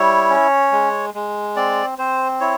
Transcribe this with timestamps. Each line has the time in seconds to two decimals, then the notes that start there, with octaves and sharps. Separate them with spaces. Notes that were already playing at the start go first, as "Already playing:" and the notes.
Already playing: G3 E4 C#5
0.30 C#4
0.72 G#3
1.14 G#3
1.56 C4 D5
1.98 C4 C5
2.40 E4 C#5